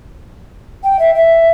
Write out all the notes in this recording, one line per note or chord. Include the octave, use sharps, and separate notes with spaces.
G5
E5
E5